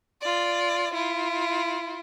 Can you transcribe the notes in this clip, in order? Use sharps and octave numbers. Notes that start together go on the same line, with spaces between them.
F4 D5
E4 F4